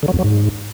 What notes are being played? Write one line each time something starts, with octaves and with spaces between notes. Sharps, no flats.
D3
F#3
F2
F#3
G#2